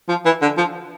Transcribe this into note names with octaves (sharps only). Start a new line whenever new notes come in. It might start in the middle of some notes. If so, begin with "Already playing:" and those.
F3
E3
D3
F3